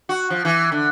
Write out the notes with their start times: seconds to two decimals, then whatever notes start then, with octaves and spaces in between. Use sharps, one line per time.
0.09 F#4
0.30 F3
0.45 E3
0.72 D3